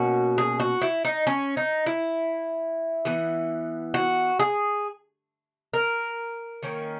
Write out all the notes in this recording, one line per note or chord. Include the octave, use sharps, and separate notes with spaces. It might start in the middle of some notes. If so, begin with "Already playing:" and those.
Already playing: B2 A#3 C#4 F#4
G#4
F#4
E4
D#4
C#4
D#4
E4
E3 B3
F#4
G#4
A#4
D#3 A#3 C#4